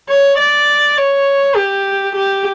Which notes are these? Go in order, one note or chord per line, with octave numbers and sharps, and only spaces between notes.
C#5
D5
C#5
G4
G4